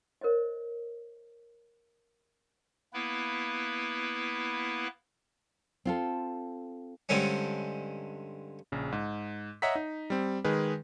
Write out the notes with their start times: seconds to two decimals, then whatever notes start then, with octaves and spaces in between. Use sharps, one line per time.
0.21 A#4 C5 C#5 D#5
2.94 A#3 B3 E4 B4
5.85 C4 F4 A4
7.09 G2 D3 G#3 C4 C#4
8.72 A#1 C#3
8.92 G#2
9.62 C#5 D#5 E5 F#5 A#5 B6
9.75 D#4
10.10 G3 C4
10.44 D#3 G#3 G#4 B4